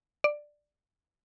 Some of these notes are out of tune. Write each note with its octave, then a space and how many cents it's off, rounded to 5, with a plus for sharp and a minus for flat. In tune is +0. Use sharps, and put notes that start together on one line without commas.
D5 +10